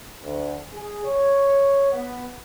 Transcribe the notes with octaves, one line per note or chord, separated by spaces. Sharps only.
D2
G#4
C#5
B3